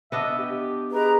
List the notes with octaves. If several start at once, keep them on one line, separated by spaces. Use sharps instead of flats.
B3 D4 D#5 E5
G4
G#4 B4 D#5 A#5